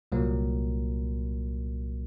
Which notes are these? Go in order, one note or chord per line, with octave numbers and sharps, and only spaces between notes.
C2 A#2 F#3 A#3